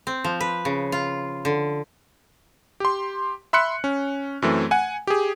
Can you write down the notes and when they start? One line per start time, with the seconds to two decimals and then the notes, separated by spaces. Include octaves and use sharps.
0.07 C4
0.24 F3
0.40 B4
0.65 C#3
0.92 F4
1.45 D3
2.80 G4 C6
3.53 E5 B5 C6 F#6 C#7
3.84 C#4
4.42 F#2 E3 A3 C4
4.71 F#5 G#5
5.07 G4 G#4